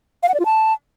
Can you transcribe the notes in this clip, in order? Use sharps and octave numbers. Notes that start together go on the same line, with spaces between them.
F5
F#5
D5
F4
A5